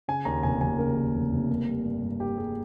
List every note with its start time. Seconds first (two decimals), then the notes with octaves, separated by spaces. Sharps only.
0.08 C#3 G#5
0.25 D#2 A#5
0.43 F1 G#5
0.61 F1 G#5
0.78 C#3 A#4
0.97 D#2
1.14 F1
1.32 F1
1.49 A#3
1.67 G3
1.85 G2
2.03 G2
2.20 A#3 G4
2.38 G3 G#4